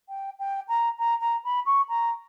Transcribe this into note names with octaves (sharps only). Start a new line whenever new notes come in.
G5
G5
A#5
A#5
A#5
B5
C#6
A#5